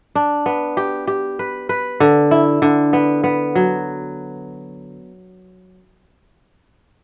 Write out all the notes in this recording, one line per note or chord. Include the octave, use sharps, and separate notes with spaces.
D4
B3
G4
G4
B4
B4
D3
E4
D3
B3
B3
F#3